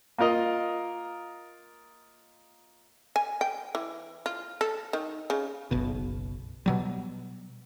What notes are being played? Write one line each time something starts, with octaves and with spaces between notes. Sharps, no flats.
A#3 F4 A#4 D#5
G#5
G5
E3
F4
A4
D#3
C#3
F#1 B1 B2
B2 F#3 G3